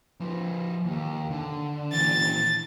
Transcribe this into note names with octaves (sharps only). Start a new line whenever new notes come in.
F3 B4
D#2
D3
A#2 E3 A6